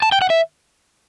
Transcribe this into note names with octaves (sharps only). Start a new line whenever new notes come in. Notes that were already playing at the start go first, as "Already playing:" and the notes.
A5
G5
F#5
E5